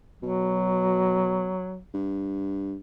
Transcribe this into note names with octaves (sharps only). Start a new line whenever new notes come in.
B2 F#3
G2